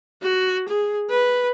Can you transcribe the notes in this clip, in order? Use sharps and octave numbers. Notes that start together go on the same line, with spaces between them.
F#4
G#4
B4